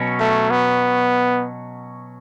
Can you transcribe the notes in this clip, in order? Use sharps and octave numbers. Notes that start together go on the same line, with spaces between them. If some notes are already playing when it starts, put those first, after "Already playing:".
Already playing: B2 F#3 C#4
A3
B3